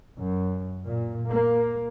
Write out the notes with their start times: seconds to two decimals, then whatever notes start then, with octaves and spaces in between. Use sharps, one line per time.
0.18 F#2
0.85 A#2
1.30 A#3